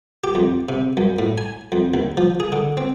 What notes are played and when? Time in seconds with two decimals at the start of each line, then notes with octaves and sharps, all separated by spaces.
0.24 G4
0.35 F2
0.69 C3
0.97 F#2
1.19 A2
1.38 G#5
1.72 F2
1.94 D#2
2.17 F3
2.40 G#4
2.52 D3
2.77 C4